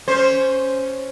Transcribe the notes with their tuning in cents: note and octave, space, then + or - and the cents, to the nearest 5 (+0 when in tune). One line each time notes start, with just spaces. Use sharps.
C#4 +0 C5 +0